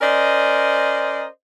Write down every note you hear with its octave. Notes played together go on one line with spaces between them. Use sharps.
C#4 A#4 C5 D5 D#5